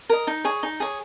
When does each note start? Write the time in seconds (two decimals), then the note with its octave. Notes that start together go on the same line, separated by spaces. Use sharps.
0.09 A#4 D#5
0.27 D#4
0.44 G#4 C#5
0.63 D#4
0.80 G#4 C#5